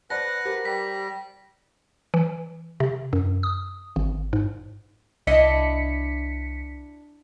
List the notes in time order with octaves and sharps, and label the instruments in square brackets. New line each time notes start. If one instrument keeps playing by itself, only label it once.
[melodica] B4 F#5 [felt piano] C5 D5 A5 [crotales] A#6
[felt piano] G4 A#4 C5
[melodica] G3 [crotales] B6
[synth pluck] E3
C3
F#2
D#6
G#1
G#2
[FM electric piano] C2 B6 C#7 [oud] D4 E4 D#5